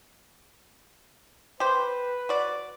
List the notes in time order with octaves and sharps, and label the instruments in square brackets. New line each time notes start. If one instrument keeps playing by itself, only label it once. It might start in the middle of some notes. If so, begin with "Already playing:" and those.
[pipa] G4 C5 [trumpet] B4
[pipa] F#4 D5